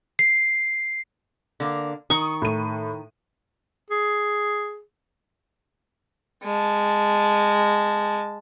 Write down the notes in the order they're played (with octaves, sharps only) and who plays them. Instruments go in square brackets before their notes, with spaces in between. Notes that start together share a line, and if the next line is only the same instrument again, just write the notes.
[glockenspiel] C7
[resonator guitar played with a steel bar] D3 A#3
[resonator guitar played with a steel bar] D#3 [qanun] C#6 [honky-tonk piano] D#6
[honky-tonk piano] A2 D#7
[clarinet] G#4
[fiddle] G#3 A5